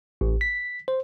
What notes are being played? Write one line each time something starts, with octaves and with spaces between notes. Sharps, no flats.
A1
B6
C5